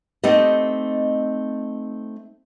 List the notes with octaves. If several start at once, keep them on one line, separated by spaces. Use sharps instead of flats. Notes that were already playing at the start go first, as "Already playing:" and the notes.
A3 C4 D#4 G4 D#5